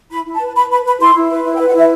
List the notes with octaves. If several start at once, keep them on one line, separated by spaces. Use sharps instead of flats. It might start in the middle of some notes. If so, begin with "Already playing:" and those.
E4 B5
E4
A5
B4
B4 B5
B4 B5
B4 B5
E4 C6
E4
B4
E4
G5
B4
F#5
E4 E5